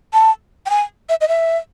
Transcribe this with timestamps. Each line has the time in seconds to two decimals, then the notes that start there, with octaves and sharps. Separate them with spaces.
0.13 A5
0.66 G5
0.70 G#5
1.09 E5
1.21 D#5
1.28 E5